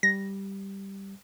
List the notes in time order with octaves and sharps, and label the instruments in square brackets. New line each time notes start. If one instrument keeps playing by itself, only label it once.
[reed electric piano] G3 [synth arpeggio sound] A#6